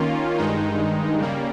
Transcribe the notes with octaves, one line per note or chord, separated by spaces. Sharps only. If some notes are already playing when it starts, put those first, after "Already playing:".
Already playing: D#3 A#3 C#4 F4
G2 D#3 G#3 D#4
C#3 G3 A#3